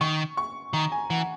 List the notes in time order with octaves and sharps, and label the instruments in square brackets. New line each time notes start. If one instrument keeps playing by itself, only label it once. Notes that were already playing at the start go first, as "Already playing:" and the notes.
[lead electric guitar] D#3 [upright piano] C#6
[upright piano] C#6
[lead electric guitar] D#3 [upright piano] A#5
[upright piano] G#5
[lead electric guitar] E3 [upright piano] F#5